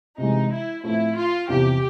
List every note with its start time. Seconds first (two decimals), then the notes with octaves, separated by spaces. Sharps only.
0.18 C3 E3 G#3 D#4
0.51 E4
0.83 A2 F3 A3 C4 E4
1.16 F4
1.48 E2 C3 F3 G4